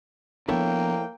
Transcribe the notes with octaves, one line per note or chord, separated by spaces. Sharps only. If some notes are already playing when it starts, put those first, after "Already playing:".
F3 A#3 B3 D4 E4 A4 C#5 G5